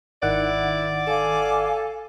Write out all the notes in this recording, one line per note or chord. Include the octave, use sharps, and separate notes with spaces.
G#1 D#3 E4 D5 F#5
A4 F5 G#5 D6